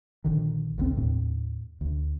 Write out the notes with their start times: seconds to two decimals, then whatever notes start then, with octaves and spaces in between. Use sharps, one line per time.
0.24 A#1 D3 D#3
0.78 A1 D2 C4
0.97 D#2 A2
1.81 D2